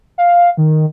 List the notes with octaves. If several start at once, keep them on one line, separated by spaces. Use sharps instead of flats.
F5
D#3